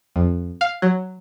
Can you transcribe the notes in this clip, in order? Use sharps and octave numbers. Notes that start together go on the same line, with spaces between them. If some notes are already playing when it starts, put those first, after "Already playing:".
F2
F5
F#3